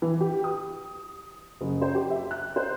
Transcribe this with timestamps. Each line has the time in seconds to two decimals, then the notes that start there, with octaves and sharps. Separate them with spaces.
0.02 E3
0.21 G4
0.44 D#6
1.61 F#1
1.82 C5
1.95 G4
2.10 E5
2.31 F#6
2.56 C5